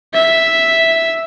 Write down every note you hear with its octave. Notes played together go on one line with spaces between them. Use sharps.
E5